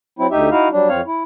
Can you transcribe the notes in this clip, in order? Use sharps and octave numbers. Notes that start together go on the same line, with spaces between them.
F#3 C4 E4
D2 D#4 G4 E5
D#4 E4 F#4 F5
F#3 G3 D4
F2 C4 C#5 F5
E4